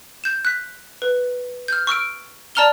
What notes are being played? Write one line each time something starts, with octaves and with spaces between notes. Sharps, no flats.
G6 E7
F#6 B6
B4
F6 G6
C#6 E6 F6 D7
D5 A5 A#5 F6 F7 G7